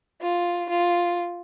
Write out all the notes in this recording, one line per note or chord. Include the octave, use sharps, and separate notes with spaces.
F4
F4